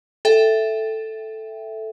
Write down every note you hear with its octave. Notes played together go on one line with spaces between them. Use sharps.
A4 E5 G5